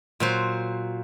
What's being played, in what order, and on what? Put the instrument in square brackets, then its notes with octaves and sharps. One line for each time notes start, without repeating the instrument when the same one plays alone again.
[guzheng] A#2 F#3 C5